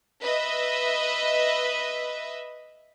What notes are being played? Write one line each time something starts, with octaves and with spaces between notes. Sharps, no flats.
B4 D#5 E5